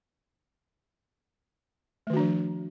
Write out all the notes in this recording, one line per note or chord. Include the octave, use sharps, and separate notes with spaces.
D#3 F3 A3 D4 F#4